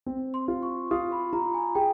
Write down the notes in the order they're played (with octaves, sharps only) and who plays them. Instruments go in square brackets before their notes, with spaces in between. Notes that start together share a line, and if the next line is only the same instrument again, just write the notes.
[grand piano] C4
[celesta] C6
[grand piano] F4
[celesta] C#6
[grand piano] F4 [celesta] D#6
[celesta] B5
[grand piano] F4 [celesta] A#5
[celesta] G#5
[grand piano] G#4 [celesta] G5